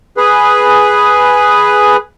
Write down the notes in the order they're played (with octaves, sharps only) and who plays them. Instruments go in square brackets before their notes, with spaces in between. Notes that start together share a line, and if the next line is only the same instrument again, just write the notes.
[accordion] G#4 B4